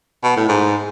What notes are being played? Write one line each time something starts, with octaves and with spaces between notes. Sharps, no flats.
B2
A2
G#2